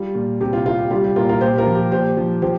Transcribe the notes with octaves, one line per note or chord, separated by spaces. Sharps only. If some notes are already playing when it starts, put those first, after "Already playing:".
Already playing: G3 F4
A#2
C3 G4
F4
C3 F4
G4
G3 F4
G4
A#2 F4 A#4
F4 A#4
A#2 G4 C5
F4 A#4
F3
G4
A#2 G4 C5
F3
F3 G4 C5